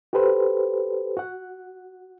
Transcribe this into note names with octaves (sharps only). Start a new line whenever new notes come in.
F#4 G4 A4 B4 C5
F#4 F#5